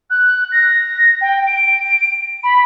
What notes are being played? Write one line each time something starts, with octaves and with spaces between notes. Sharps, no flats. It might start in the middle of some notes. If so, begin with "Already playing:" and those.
F#6
A#6
G5
D7
B5